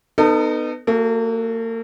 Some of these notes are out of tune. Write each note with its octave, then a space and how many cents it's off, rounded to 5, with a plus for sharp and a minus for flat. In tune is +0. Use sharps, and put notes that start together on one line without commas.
B3 +15 D#4 -20 A4 +30
A#3 -40 F#4 +0 A4 -10